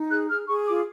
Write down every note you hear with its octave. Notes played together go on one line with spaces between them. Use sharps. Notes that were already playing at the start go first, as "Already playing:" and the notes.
Already playing: D#4
G#4 F#6
G#4 F6
G#4 C#6
F4 D6